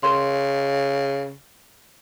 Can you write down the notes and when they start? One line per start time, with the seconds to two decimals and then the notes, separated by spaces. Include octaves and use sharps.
0.03 C#3 A#4 C6